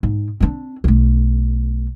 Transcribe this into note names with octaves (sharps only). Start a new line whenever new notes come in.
G#2
C4 D4
B1 A3